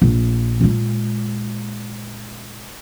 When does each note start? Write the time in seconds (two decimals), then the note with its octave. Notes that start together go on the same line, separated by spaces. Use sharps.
0.02 A#1
0.61 A#2 G#3